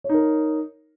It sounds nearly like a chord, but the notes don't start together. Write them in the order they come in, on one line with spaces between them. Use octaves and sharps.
C#5 D#4 A#4